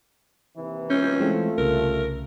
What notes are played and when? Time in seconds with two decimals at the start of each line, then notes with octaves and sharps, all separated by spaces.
0.58 D#2 C3 E3
0.90 C#4 G6
1.20 E3 G#3 A3 C4 F4
1.58 C2 C#3 A#4